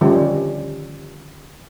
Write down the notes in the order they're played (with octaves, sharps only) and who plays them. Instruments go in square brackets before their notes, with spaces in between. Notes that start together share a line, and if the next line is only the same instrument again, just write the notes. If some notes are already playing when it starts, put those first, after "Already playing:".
[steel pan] D3 D#3 F3 G3 C#4